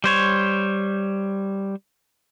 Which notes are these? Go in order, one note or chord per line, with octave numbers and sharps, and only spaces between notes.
G3 C5 C#5